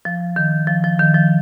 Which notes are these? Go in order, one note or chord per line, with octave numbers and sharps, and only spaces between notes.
F3
D#3
F3
F3
D#3
F3